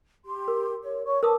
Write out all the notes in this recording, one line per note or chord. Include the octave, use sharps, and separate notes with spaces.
G4 C6
A#4
C#5
C#5 C#6
A#4 B4 A5 D6 D#6